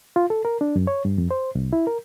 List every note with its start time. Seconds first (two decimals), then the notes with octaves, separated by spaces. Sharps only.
0.16 F4
0.30 A4
0.45 A#4
0.61 D4
0.76 F#2
0.87 C#5
1.05 G2
1.18 F2
1.31 C5
1.55 C2
1.73 E4
1.87 A#4